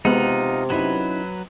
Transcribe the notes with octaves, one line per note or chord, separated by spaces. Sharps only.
C3 G#3 B3 D#4 F4 F#5
F#3 C#4 D#4 E4 B4